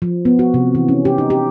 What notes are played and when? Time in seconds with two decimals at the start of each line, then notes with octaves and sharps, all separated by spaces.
0.02 F3
0.25 B3
0.39 F#4
0.54 C3
0.75 E3
0.88 C#4
1.05 G4
1.18 D#4
1.30 G4